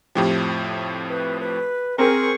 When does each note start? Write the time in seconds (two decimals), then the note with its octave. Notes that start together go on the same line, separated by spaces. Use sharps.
0.15 F2 A2 F3 G4
1.09 B4
1.40 B4
1.98 C4 G#4 A#4 G#5 C#6